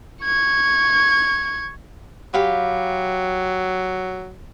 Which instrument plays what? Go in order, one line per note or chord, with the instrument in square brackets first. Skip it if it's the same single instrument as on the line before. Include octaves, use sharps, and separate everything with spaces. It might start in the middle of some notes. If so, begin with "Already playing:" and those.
[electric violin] C#6 G#6
[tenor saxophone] F#3 [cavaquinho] G4 F5 B5